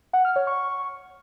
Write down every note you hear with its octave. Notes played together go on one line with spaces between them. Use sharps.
F#5
F6
C#5
C#6